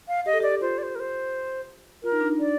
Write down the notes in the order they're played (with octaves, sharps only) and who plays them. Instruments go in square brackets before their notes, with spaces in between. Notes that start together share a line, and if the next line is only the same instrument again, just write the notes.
[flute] F5
[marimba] G4 [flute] D#5
[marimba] A4
G4
[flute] D5
[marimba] G4
[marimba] F4 [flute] C5
[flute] D5
C5
A#4
C5
[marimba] F4 [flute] A#4
[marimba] D#4
D4
D#4
[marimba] D4 [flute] D5